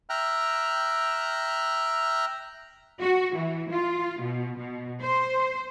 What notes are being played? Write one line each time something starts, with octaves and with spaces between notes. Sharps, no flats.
E5 G5 A#5 F6 F#6
F#4
E3
F4
B2
B2
C5